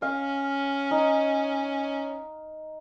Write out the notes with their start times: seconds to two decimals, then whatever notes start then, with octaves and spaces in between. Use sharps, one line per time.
0.02 C#4 F5
0.91 D#4